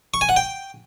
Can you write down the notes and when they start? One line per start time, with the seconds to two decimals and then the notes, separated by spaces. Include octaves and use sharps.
0.14 C#6
0.21 G#5
0.29 F#5
0.36 G5